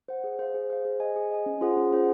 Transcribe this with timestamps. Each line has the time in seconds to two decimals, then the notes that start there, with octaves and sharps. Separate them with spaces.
0.08 C5 F#5
0.24 G#4
0.39 C5 F5
0.54 G#4
0.70 C5 F5
0.85 G#4
1.00 D#5 G#5
1.16 G#4
1.31 D#5 G#5
1.46 C#4
1.61 F4 G#4 C5 F#5
1.77 C#4
1.92 F4 G#4 C5 F#5